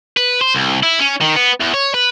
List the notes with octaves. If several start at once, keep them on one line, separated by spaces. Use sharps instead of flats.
B4
C5
C2
E4
C#4
D#3
B3
E2
C#5
B4